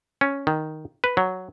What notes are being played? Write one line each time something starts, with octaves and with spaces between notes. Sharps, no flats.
C#4
D#3
B4
F#3